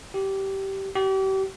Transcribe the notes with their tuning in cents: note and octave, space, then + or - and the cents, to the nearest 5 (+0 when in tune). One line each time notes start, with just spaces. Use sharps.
G4 -15
G4 -35